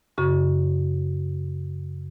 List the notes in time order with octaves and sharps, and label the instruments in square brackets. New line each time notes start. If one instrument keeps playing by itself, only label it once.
[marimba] F#2 C#3 F#4 C#6